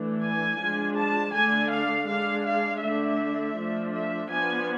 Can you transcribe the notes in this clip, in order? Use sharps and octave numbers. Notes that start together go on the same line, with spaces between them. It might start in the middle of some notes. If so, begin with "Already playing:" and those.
Already playing: E3 A3 D4
G#5
F3 G#3 D4
A5
D3 A3 D4 G#5
F5
G#3 D4 F5
F5
D3 A3 D4 E5
F3 A3 D4
E5
F3 B3 D4 G#5